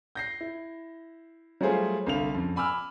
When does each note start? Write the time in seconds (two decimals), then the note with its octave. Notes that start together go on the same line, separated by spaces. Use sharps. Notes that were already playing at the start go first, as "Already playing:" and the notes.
0.15 G6 A#6 C7
0.41 E4
1.61 F#3 G3 A3 F4 G#4 C5
2.06 C2 D3 F5 F7
2.33 F2 C#3
2.56 G#5 B5 D6 E6 F6